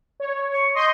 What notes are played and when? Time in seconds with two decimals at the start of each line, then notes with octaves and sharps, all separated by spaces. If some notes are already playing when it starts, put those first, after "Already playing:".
0.20 C#5
0.54 C#6
0.75 D#5 C6 G6